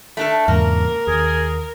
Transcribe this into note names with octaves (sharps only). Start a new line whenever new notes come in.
A3 D4 A4
E2 G#2 C#3 A#3 A#4
D#2 G#4